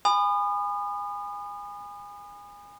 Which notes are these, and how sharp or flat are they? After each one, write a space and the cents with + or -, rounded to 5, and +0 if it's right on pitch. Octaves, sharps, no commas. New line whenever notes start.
G#5 -25 B5 +20 D#6 -35